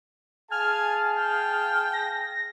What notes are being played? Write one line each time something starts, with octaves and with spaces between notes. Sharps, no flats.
G#4 F5 G#5 A5 F6
G5
A#6